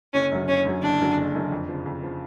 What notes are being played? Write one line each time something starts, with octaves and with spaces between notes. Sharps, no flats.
F#1 C#4
F#2 D3 F#3
F#1 C#4
F#2 D3 F#3
F#1 D4
F#2 D3 F#3
F#1
F#2 D3 F#3
F2
C#3 F3
F2
C#3 F3